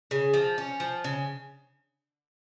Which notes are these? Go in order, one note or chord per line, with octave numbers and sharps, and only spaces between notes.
C#3
F3
C#4
F3
C#3